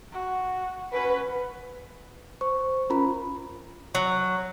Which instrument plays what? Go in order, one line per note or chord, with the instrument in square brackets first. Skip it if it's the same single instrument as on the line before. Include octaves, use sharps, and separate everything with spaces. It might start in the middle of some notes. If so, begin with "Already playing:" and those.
[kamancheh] F#4
[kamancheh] C#4 F#4 [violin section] B4
[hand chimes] C5 C#6
C#4 F4 A#4 A#5 B5
[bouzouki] F#3